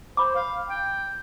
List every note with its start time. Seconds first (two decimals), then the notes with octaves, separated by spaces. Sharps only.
0.17 C5 B5 D6
0.35 F5
0.69 G5